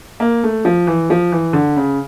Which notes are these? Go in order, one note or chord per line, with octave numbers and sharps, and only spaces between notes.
A#3
A3
F3
E3
F3
E3
D3
C#3